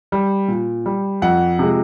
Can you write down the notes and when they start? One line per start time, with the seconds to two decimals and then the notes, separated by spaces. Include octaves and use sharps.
0.12 G3
0.48 A#2
0.86 G3
1.22 F2 F#5
1.59 C3 F3 G#3